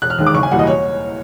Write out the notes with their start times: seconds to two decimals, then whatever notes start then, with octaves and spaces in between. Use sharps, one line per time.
0.02 E1 F#6
0.10 F6
0.18 D#2 D#3 G#3
0.27 D6
0.34 F#1 C#6
0.43 G#5
0.51 E2 B2 G3 A#3 F#5
0.59 D#5
0.67 C#5